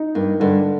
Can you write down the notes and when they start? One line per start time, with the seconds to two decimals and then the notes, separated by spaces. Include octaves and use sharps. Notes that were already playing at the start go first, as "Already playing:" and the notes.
Already playing: D#4
0.15 G2 A#3
0.40 G2 D3